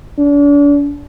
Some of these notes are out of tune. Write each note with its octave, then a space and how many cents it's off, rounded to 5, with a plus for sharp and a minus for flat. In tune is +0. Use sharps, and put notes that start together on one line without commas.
D4 -40